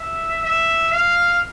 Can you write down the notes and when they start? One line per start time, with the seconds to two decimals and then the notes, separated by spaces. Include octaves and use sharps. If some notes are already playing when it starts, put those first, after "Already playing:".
Already playing: E5
0.45 E5
0.91 F5